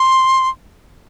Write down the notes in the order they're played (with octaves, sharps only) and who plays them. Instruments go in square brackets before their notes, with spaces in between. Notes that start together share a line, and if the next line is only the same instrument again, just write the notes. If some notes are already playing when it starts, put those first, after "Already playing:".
Already playing: [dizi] C6